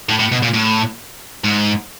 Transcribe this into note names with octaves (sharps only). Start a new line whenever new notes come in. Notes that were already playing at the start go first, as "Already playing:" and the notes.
A2
A2
B2
A#2
A2
G#2